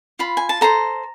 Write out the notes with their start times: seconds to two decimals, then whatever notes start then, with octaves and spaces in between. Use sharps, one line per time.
0.19 F4 B5
0.37 G#5
0.49 A5
0.61 A4 C5 A#5